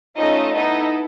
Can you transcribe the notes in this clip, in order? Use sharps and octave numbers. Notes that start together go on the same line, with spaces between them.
A3 C#4 D#4 F4 A4 D#5
B3 D#4 E4 A4 D#5